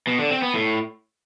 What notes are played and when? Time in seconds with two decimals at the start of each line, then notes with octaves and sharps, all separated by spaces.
0.07 B2
0.19 D3
0.31 C4
0.42 B3
0.54 A2